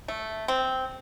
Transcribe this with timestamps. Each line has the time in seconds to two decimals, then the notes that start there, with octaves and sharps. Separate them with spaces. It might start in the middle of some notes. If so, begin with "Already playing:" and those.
0.08 A3
0.48 C4